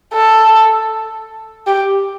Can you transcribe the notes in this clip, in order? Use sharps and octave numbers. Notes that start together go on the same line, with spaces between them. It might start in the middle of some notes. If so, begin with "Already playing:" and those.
A4
G4